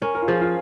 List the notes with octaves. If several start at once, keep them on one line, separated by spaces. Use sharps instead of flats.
C#4 A#4
A#4
F4
F3 G#4
F4